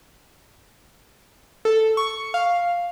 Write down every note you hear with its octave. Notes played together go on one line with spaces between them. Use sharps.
A4
C#6
F5